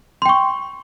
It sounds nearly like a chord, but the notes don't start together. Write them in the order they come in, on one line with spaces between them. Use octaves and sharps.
C6 G5 C#6